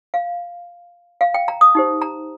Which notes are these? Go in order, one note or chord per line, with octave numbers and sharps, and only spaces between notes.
F5
F5
G5
A#5
D#6
D#4 G4 C5
A#5